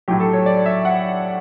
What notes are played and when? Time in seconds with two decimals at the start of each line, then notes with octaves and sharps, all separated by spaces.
0.08 A2 F#3 G4
0.20 A4
0.33 C#5
0.46 D5
0.66 E5
0.85 F#5